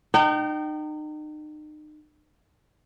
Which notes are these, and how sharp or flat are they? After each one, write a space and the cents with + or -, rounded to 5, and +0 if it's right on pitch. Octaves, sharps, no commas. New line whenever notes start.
D#4 -35 G5 -30